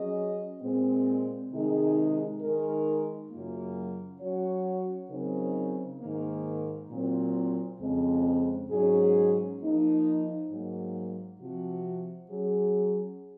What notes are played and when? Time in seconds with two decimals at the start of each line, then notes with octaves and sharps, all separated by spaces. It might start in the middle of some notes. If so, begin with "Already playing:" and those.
Already playing: F#3 C#4 G#4 D#5
0.62 A#2 G#3 C4
1.51 C3 D#3 G#3 D#4 G#4
2.42 D#3 G#3 D#4 A#4
3.32 F#2 C#3 F#3 A#3 F4
4.21 F#3 C#4 F#4 C#5
5.10 C#3 F#3 C4 D#4 A#4
6.01 G#2 D#3 A#3
6.90 A#2 F#3 C4
7.80 F2 C#3 G#3 C4
8.70 G#2 F#3 C#4 G#4
9.60 F3 A#3 D#4
10.50 G#2 F#3 A#3
11.39 C3 F3 C4 F#4
12.29 F#3 C#4 G#4